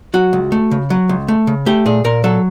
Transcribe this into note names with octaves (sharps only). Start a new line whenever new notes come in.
F#3 F#4
C#2
A3
C#3
F#3
C#2
A3
C#3
A3 G4
A#2 G#4
A#2 A#4
F#3 A4